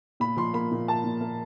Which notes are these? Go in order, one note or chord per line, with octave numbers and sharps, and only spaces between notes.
A#2 B5
F3 C6
A#3 B5
A#2
A#3 A5
A#2
A#3